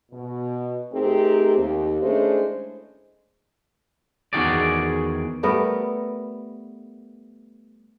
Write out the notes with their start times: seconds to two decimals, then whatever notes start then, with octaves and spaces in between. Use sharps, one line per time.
0.12 B2
0.92 A3 C4 D#4 G4 G#4 A#4
1.57 D#2
2.01 G#3 A3 C#4 D4 E4 C5
4.33 E2 G2 D#3 F#4 G#4 D5
5.43 G3 A3 B3 A#4